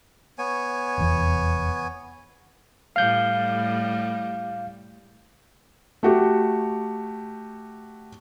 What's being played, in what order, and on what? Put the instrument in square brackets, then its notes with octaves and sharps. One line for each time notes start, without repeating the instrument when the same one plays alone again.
[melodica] B3 C#5 G#5
[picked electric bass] F1 E2
[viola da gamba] A2 G3 A3 [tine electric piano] F5 G6
[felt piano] A3 F#4 G4